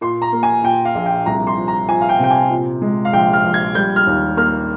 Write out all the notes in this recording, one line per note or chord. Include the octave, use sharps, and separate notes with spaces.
A#2 C6
A#5
A#3
G#5
A#2 G5
F5
A#1
G5
C2 A#5
C6
F3
A#5
F3 G#5
F5
G5
C3 G5
G#5
A#2
G#3
F5
A#1 G5
F6
A#1
G#6
G3 G6
F6
D#2
A#3 F6